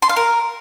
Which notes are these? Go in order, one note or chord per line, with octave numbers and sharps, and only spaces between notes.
C6
F5
A#4